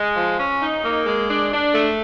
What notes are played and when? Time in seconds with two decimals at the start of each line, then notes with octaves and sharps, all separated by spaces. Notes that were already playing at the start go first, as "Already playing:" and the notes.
Already playing: G#3
0.16 F3
0.39 C#4
0.62 D#4
0.83 A#3
1.06 G#3
1.28 D4
1.51 D4
1.74 A3